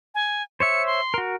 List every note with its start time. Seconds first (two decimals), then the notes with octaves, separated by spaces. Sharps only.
0.15 G#5
0.60 C5 C#5 E5 C#7
0.87 C6
1.14 F#4 A#4